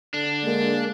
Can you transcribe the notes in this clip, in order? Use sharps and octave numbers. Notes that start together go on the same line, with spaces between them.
D3 D4
G#3 A#3